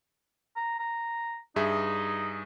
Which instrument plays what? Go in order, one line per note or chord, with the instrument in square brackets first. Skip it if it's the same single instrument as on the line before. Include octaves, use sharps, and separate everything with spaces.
[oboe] A#5
A#5
[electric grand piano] G2 G#4 E5 [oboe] D#4